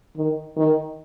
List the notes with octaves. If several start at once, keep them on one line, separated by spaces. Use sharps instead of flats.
D#3
D#3